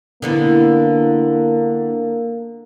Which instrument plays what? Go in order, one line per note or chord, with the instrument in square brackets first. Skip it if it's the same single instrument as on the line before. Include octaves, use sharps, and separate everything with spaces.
[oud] D3 B3 E4 [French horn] A#3